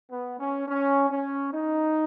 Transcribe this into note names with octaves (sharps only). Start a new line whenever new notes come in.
B3
C#4
C#4
C#4
D#4